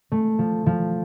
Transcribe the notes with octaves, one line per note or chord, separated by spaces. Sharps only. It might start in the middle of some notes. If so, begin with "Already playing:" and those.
A3
F3
F3